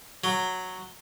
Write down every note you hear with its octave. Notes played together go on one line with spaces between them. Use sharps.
F#3